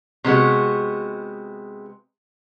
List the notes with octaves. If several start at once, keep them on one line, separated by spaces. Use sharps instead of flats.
C3 G#3 B3 F#4